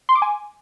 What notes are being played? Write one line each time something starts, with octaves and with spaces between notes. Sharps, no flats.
C6
D6
G#5